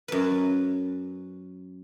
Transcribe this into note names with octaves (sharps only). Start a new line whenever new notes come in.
F#2 B4